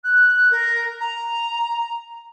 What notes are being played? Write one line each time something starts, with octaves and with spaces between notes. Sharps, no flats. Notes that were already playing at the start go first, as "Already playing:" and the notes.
F#6
A#4
A#5